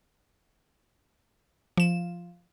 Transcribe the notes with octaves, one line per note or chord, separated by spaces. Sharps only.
F3 E7